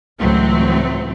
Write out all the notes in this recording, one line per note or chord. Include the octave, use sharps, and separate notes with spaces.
C#2 A2 E3 F#3 C4